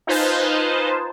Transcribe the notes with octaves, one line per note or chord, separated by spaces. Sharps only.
D#4 F4 B4 C5 G#5 A5